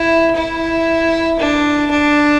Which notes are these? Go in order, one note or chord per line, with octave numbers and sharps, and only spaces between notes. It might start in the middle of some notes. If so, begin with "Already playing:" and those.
Already playing: E4
E4
D4
D4